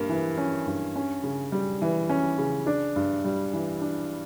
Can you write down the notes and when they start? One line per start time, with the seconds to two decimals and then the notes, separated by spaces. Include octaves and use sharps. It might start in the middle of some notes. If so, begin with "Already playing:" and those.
Already playing: G2 A#3
0.09 E3
0.37 C#4
0.67 G2
0.96 C#4
1.24 C#3
1.52 G3
1.82 E3
2.10 C#4
2.38 C#3
2.67 D4
2.96 G2
3.24 G3
3.53 E3
3.81 D4